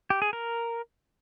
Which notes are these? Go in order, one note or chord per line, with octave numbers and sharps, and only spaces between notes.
G4
G#4
A#4